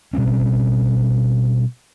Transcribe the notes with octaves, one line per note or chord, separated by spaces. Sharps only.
B2 G3 C4 C#4